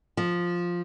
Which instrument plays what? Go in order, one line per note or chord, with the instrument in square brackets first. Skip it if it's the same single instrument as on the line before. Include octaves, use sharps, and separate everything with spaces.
[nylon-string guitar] F3